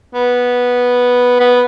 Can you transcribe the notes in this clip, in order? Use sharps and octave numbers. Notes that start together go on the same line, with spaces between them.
B3
B3